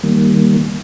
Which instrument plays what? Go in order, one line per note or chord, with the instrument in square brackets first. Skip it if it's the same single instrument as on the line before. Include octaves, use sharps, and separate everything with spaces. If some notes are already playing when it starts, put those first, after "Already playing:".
[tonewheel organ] D#3 G3 A#3